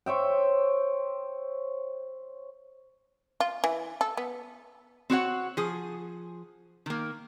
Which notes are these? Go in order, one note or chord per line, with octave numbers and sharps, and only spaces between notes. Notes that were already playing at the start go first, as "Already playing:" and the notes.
C5 C#5 E5 G5
F4
E3
A4
B3
C4 F#4 C#5 F#5
F3 G#4
D#3 A#3